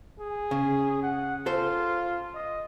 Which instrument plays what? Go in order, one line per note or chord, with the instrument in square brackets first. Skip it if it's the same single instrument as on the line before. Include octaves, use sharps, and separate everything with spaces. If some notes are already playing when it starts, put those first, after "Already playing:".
[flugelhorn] G#4
[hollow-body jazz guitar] C#3
[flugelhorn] F#5
[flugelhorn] F4 [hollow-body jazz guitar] A4 C5
[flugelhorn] D#5